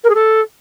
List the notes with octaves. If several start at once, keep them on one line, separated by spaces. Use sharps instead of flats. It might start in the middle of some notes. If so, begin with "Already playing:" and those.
A#4
G#4
A4